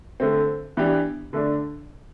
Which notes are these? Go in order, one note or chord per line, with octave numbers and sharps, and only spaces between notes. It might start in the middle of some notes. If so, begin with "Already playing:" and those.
D3 A3 C4
E3 B3 D4 G4
D3 A3 D4